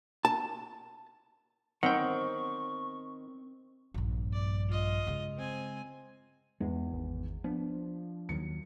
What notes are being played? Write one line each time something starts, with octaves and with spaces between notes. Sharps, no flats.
A5
D#3 C4 F#5 G5 C#6
A#1 G2
D5
F4 D#5
C#3 G#3
C4 G#5
E2 G#3
G#1
F3 B3 D4
D#2 D#3 F#3 C#7